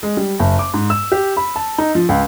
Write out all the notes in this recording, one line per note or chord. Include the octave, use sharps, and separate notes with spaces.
G#3
G3
F#1
D6
G#2
E6
G4
B5
A5
D#4
F3
C#2